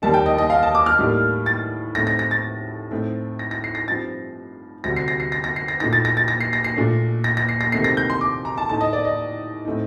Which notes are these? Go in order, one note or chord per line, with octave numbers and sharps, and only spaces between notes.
D#2 D#3 G3 A#3 D#4 A5
G5
D#5
D#5
F5
A5
D6
F6
A2 G3 A#3 D#4
A6
A2 A3 C4 D#4 A#6
A#6
A#6
A6
A2 A3 C4 D#4
A#6
A#6
C7
A#6
G2 F3 C4 D#4 A6
D2 C3 G3 A#6
C7
A#6
C7
A#6
A#6
C7
A#6
A#2 A3 D#4 A#6
A6
A#6
A6
A#6
C7
A#6
C7
A#2 A3 D4
A#6
A#6
C7
A#6
C3 D#3 A3 C4 C7
A#6
G6
C6
D6
A#5
A5
A2 A3 D#4 A5
D#5
D5
D#5
A2 A3 C4 D#4